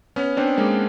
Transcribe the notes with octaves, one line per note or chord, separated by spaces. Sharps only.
B3 C#4
C4 D4
G#3 A#3